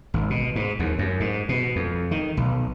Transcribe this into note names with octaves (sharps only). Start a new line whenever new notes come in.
G#1
B2
G#2
D#2
F#2
G#2
B2
F2
D#3
B1